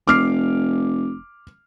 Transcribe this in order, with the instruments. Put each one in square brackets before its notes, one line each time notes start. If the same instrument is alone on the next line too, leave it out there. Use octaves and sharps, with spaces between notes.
[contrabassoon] F1 [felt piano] D6 F6 C7